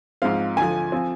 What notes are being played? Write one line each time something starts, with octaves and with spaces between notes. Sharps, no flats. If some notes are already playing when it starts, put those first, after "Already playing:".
G#2 F3 G#3 C4 F5
D2 D3 F3 G#5
F3 C4